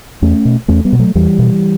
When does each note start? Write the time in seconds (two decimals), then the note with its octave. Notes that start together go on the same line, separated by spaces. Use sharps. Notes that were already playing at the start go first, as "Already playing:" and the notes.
0.22 E2 A3 C#4
0.45 B2
0.68 E2 A3 C#4
0.85 G3 B3
0.93 B2
0.99 F#3 A3
1.15 E2 E3 G3
1.39 B2